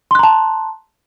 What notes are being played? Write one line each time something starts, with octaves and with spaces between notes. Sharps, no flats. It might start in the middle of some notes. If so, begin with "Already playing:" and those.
A5 A#5 C6 F#6